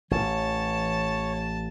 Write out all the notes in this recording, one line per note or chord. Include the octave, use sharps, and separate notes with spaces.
A1 E3 C#5 A5